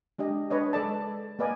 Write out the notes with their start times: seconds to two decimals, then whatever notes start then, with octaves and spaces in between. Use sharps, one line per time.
0.18 G#3 D4 G4 D#5
0.51 D4 B4 C#5 D#5
0.73 G#3 A4 D5 A5
1.39 A#3 A#4 B4 D5 D#5 G#5